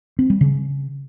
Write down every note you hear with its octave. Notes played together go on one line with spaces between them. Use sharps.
C4
G3
C#3